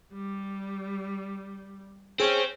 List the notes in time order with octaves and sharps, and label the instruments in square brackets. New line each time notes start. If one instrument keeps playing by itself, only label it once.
[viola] G3
[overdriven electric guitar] C4 [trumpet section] C#4 [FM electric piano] G#4